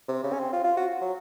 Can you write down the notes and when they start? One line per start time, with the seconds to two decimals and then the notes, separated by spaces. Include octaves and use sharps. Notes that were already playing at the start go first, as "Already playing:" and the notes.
0.08 C3
0.24 C#3
0.33 C#4
0.40 C4
0.53 F4
0.64 F4
0.77 F#4
1.01 F#3